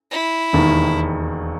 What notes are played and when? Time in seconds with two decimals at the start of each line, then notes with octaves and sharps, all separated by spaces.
0.11 E4
0.53 E1 D#2 D#3